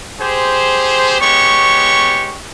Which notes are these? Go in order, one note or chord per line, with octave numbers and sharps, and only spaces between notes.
G4 G#4 C5
G#3 B3 G4 C#5 C#6